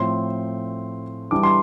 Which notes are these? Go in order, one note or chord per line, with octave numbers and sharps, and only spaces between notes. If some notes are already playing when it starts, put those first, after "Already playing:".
Already playing: A2 F3 C4 C6
E3 G3 D4 D6
C6